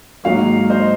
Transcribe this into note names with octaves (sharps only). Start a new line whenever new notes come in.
G#2 D#3 F#3 A#3 C#5 F5
C5 D#5